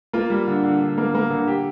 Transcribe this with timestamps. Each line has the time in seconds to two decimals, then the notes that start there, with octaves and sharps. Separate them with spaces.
0.13 A#3 F4
0.30 G3
0.47 D3
0.64 D3
0.81 D3
0.98 A#3
1.15 A#3
1.30 D3
1.48 G4